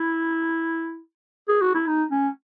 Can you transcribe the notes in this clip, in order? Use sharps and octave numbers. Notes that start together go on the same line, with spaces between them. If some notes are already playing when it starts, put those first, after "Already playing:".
Already playing: E4
G#4
F#4
E4
D#4
C#4